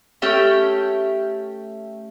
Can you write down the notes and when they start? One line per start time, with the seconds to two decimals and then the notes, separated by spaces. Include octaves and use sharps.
0.22 A3 C#4 G4 G5